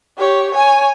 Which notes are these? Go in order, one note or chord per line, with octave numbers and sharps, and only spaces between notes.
G4 C#5
C#5 G#5